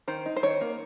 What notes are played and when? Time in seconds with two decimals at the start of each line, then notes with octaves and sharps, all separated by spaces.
0.08 D#3 C5
0.26 D#4
0.36 C5
0.43 D#3 C#5
0.61 A#3